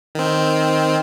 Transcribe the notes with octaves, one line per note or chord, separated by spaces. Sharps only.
D#3 C4